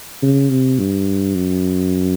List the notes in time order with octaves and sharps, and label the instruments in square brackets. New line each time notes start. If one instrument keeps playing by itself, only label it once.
[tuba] C#3
C3
G2
F#2